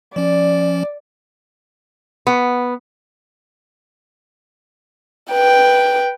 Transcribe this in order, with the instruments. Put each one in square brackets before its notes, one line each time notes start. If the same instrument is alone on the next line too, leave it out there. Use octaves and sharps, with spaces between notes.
[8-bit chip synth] F3 C#4 [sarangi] D5
[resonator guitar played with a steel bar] B3
[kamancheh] B4 G5